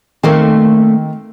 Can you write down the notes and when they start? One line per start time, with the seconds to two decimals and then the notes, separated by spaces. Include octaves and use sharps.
0.23 D#3 A3 A#3 C4